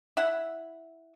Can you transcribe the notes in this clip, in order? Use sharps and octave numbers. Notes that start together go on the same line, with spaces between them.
E4 E5 F#5